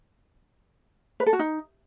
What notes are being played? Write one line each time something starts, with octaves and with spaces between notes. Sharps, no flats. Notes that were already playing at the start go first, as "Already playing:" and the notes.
B4
A4
F#4
D#4